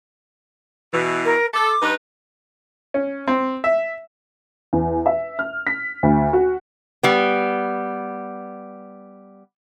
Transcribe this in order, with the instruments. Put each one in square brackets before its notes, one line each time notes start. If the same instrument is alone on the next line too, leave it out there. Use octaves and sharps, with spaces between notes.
[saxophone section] B2 E3
[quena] A#4
[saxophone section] A4 [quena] D6
[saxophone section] G2 D#4 B4
[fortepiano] C#4
C4
E5
[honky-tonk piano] E2
E5
F6
B6
D2
F#4
[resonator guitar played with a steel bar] G3 B3